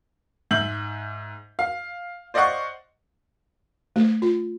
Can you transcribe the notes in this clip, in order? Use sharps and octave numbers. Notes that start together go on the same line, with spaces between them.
G#2 E5 G6 F#7
F5
C5 D5 D#5 F5 F#5 C#6
A3
F4